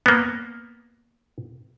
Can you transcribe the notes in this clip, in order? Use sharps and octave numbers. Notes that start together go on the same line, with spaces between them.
A#3 B3